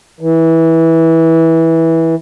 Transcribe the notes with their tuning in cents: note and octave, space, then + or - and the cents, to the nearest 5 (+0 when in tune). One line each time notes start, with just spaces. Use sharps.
E3 -15